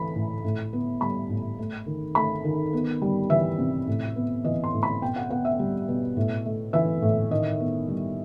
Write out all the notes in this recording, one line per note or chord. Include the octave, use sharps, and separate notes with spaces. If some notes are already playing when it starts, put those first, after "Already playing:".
Already playing: E3 A3 B5
A2
A2
B3
G3 B5
A2
A3
D#3
A3 B5
D#3
B3
G3
E3 E5
C3
A2
B3
E3 D#5
C6
A2
B5
B2 G5
F#5
B3 F#5
E5
G3
B2
A2
A3
E3 E5
A2
D#3 D#5
B3
G3